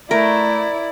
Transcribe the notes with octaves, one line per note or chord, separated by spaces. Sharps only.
A3 E4 A#4 D5